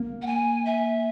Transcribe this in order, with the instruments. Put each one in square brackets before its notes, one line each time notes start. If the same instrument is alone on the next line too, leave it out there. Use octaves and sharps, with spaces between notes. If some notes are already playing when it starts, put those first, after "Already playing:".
Already playing: [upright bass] A#3
[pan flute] F#5
G#5
E5